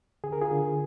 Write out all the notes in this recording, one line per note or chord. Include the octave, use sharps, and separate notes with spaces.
D3 G#4
A#4
F4 G#4
D3